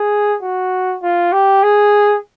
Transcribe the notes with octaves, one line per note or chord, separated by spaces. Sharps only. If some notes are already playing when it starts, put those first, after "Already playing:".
Already playing: G#4
F#4
F4
G4
G#4